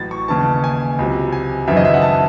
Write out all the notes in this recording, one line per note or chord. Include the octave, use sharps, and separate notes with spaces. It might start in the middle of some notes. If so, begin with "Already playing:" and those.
Already playing: A1 A2 F#3 A6
C#6
D#2 C#3 E3 A5
G#5
C#2 C3 F#3
G#5
G#1 F#2 C#3 E3 E5
D#5
E5
F#5
A5